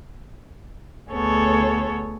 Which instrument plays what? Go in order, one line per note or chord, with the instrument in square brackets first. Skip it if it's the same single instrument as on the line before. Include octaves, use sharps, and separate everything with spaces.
[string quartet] D2 B3 G#4 A4 C#5